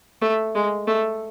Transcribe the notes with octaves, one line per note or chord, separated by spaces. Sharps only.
A3
G#3
A3